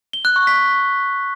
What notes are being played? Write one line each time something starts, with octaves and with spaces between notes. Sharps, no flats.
G7
F#6
C#6
B6